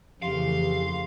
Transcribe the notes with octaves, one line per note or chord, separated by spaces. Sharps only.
F2 C#3 E3 A3 G4 F5 C6